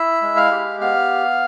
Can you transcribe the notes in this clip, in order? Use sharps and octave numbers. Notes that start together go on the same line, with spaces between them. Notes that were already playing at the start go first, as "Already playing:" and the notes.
Already playing: E4 E5 E6
G#3
F5 F6
G4
B3 F5 F6